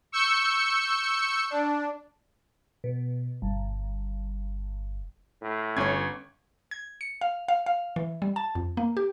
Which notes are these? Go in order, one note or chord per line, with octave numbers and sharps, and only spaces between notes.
C#6 E6 G6 C#7
D4
B2
G1
A2
G1 C#4 C#5 G#6
G#6
C#7
F5
F5
F5
E3
G3
A5
F2
A#3
G4